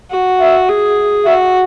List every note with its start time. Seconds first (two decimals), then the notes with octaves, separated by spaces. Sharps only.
0.11 F#4
0.40 E5
0.69 G#4
1.26 F#4 E5